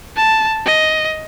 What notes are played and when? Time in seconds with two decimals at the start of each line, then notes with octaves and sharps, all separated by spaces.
0.16 A5
0.66 D#5